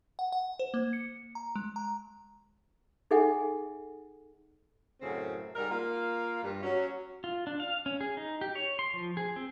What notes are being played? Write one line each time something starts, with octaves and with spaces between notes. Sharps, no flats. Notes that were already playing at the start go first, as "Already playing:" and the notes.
F#5
F#5
C5
A#3
C#7
A#5
G#3
A#5
D#4 G#4 A4 E5 F#5 G#5
F#2 A2 C#3 C4
G#2 G3 A#4
A#3 F4
G2
F#3 C#4
F4
D4
F5
C#4
G#4
D#4
G4
C#5
C6
F3
G#4
C4